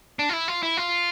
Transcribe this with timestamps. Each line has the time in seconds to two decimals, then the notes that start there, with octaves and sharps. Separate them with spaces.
0.19 D4
0.29 F4
0.33 E4
0.48 F4
0.63 E4
0.77 F4